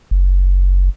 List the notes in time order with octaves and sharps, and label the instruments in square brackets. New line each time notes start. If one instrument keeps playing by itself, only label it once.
[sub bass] F#1